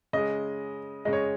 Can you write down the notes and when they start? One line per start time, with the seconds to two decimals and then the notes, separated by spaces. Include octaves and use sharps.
0.13 C#3 G#3 D#5
1.05 C#3 G#3 D#5
1.13 C#5